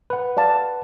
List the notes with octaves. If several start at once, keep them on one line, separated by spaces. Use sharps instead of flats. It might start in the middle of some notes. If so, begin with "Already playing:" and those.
B4 F#5
D5 F5 A5